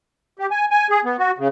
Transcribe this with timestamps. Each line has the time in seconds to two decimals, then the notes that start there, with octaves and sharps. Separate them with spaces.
0.39 G4
0.51 G#5
0.71 G#5
0.90 G#4
1.05 B3
1.18 F#4
1.38 C#3